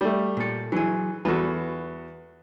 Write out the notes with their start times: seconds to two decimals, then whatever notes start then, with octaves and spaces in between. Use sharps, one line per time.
0.01 G3 A3
0.37 A#2 A4
0.72 E3 F#3 G#4
1.25 E2 F#4 A4 B4